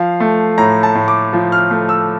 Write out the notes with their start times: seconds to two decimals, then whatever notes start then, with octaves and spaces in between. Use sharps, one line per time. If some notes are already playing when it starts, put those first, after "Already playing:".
Already playing: F3 F5
0.20 A3
0.58 A2 A#5
0.83 A5
0.95 A2
1.08 D6
1.33 F3
1.52 F6
1.71 A3
1.89 E6